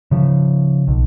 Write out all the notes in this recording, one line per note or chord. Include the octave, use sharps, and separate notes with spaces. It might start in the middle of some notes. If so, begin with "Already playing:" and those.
C#3 F3
B1